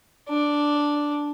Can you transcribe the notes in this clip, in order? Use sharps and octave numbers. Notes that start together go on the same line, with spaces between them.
D4